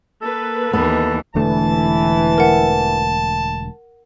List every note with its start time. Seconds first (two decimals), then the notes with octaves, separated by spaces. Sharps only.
0.22 A#3 A4 B4
0.73 D#2 E3 B3 A4
1.35 E1 D3 E3 A3 A5
2.38 A#4 F#5